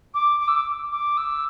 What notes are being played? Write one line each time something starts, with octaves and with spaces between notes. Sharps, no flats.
D6
D6
E6
D6
D6
E6